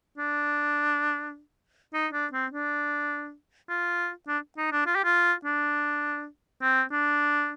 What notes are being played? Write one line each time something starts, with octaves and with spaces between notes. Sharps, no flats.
D4
D#4
D4
C4
D4
F4
D4
D#4
D4
F4
G4
F4
D4
C4
D4